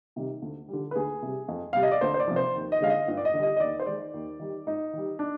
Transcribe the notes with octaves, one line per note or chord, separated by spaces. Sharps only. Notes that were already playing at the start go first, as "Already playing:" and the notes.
C3 D#3 G3
D2
D3 G3
B4
D2 G#4
C3 G3
F2
C3 G3 F5
D#5
D5
D2 C5
C5
D5
C3 F3
C5
D#2
D#5
D3 G#3 F5
D#5
G2
D5
D#5
D3
G3 D#5
D#5
D#2 D5
C5
D#3 G#3 D5
D#2
D#3 G3
G#2 D#4
D#3 G3
D4